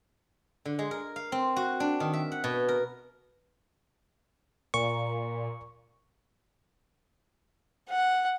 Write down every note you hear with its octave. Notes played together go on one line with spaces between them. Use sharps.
D3
G#3
A#4
F5
C4
F#4
D4
D#3
E5
F#5
B2
A#4
A#2 C#6
F#5